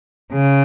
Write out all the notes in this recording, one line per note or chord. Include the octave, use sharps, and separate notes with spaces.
C#3